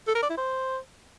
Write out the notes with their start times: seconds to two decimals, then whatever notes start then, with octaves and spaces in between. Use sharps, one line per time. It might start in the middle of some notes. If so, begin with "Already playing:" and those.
0.07 A4
0.15 A#4
0.22 D5
0.30 E4
0.37 C5